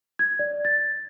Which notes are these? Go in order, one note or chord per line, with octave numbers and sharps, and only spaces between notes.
G#6
D5
A6